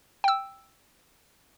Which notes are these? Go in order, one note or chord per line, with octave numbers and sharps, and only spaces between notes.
G5 E6